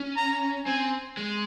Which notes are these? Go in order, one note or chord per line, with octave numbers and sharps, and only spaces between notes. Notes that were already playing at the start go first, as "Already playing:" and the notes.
Already playing: C#4
A#5
C4 G#5
G#3